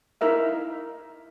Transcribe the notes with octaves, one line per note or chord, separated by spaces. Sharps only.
D#4 E4 A#4 E5 F5